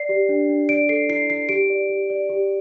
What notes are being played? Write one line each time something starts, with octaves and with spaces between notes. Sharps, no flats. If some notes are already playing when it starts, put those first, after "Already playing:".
Already playing: D5 C7
G4
D4
D4
D5 D7
A4 C7
E4 C7
E4 C7
G4 D7
D5
G4
D5
G4